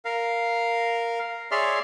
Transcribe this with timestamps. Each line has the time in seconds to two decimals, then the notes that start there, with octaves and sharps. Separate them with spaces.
0.05 A#4 F5
1.51 G#4 C#5 D5 E5 C6 F6